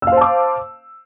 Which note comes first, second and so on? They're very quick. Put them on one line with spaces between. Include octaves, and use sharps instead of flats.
E6 F5 C5 A5 D6